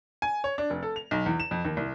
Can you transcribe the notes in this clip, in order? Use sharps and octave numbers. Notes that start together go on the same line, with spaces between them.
G#5
C#5
D4
F1
A4
F7
B1
E2
E7
F2
D#2
C2